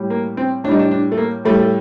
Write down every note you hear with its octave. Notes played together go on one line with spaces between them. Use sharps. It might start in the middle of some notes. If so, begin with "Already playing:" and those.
Already playing: A2 G3
A#3
C4
A2 G3 D4 D#4
D4
D4
A3
A#3
A2 G3 A3
A3